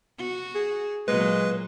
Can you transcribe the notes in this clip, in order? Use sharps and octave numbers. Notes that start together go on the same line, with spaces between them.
F#4
G#4
A#2 F#3 G#3 A#3 B4